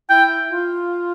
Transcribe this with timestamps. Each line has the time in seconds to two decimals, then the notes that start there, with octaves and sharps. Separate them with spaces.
0.09 E4 G5
0.50 F4